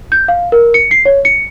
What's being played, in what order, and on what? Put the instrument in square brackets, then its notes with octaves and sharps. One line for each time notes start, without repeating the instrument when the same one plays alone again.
[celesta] G6
F5
A#4
C#7
C7
C#5
C#7